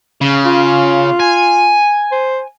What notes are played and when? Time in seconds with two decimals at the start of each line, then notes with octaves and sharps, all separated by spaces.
0.21 C#3
0.45 F4
1.20 G#5
2.12 C5